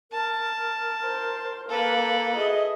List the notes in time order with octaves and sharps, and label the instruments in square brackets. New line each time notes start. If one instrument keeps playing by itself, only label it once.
[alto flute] A#4 [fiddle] A5
[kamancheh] C5
[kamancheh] A#3 [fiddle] A4 B4
[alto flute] G#4 [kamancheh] D#5 E5